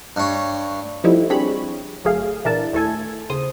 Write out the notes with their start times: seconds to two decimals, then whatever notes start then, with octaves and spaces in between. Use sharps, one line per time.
0.16 G2 C#5
1.04 F3 G3 A3 C4 D#4 E4
1.30 G3 C4 D4 G#4 C#5 B5
2.04 G1 F#3 A3 G#4 F5
2.45 A#2 E3 D4 E4 A#4 A5
2.73 D#2 A3 E4 A4 G#5 G#6
3.30 D#2 C#3 C5 D#6